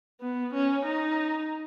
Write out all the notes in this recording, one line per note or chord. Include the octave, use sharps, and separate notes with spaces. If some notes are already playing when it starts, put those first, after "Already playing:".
B3
C#4
D#4